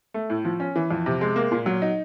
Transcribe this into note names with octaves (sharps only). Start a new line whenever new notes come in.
A3
A2
F3
C#4
E3
F2
C3
G#3
A#3
A#2
F#3
D#4